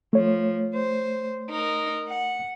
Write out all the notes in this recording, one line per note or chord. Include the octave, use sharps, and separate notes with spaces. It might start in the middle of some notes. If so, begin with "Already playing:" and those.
F3 A3 C#5
C5
D#4 A#4
F#5